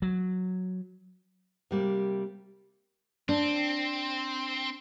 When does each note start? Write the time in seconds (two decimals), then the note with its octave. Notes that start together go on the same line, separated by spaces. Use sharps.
0.02 F#3
1.71 C3 G3 A#3
3.29 C4 D4